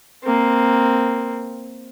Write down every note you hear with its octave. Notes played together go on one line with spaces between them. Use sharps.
A#3 C4